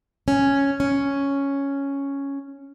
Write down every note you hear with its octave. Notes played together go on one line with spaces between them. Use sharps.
C#4
C#4